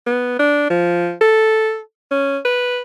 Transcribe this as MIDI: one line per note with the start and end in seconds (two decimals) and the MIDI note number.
0.06 0.36 59
0.39 0.65 62
0.70 1.13 53
1.21 1.79 69
2.11 2.38 61
2.45 2.82 71